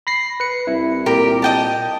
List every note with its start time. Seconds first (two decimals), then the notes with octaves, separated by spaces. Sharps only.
0.07 B5 A#6 C7
0.40 B4 C#7
0.67 C2 E4
1.06 A#2 G4 A#4
1.42 D#5 G5 A5